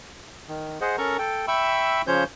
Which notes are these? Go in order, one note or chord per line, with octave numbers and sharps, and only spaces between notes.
D#3
G#4 C5 D#5 F#5
C#4 A4 A#4 A#5 C#6
A4 G5
E5 G5 B5 C#6 E6
C#3 F3 C#4 C5 C#5 G6